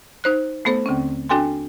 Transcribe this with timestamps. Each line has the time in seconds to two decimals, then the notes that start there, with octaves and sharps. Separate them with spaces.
0.24 D#4 C5 F#6
0.65 A3 B3 A4 C5
0.86 D#2 D3 C4 C#4
1.29 D4 F#4 A4 G5 G#5 C6